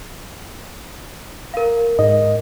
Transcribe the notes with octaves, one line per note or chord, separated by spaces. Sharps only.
A#4 F5
G#2 D#5